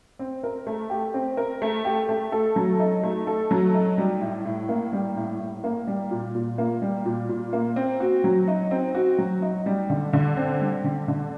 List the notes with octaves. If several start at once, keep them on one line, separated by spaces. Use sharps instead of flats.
C4
A#4
A3
G4
C4
A#4
A3
G4
A3
A4
F#3
D#4
A3
A4
F#3
D#4
G3
A2
A2
A#3
G3
A2
A2
A#3
G3
A#2
A#2
A#3
G3
A#2
A#2
A#3
C4
F#4
F#3
D#4
C4
F#4
F#3
D#4
G3
D3
D3
C4
G3
D3
D3